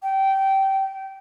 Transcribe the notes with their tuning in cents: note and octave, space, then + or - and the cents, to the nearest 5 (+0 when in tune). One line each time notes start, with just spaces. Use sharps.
G5 -20